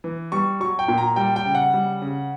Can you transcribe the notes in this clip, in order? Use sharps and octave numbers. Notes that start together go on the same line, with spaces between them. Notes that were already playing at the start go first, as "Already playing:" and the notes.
E3
G3 C#6
F#3 C#6
G5
A#2
A#5
G3 G5
G5
C#3
F#5
G3
C#3